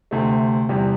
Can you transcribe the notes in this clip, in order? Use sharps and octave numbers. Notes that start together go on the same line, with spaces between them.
D2 C3 A3
E2 C3 G3